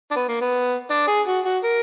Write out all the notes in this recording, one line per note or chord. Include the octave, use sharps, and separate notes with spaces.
D4
B3
A#3
B3
D4
G#4
F#4
F#4
A#4